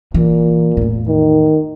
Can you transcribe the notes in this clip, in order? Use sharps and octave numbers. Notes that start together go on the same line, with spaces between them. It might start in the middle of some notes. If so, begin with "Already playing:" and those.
A#2 E3
E2 A2
D#3